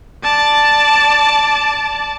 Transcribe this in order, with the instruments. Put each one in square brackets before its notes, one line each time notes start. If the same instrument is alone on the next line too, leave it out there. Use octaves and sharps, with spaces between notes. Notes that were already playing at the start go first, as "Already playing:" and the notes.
[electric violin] D5 A5